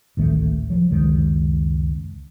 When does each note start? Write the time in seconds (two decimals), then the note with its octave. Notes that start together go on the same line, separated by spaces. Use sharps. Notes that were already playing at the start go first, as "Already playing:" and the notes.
0.17 A1 D2 D#3 A3
0.70 F3 F#3
0.91 C#2 F#2 D#3 G#3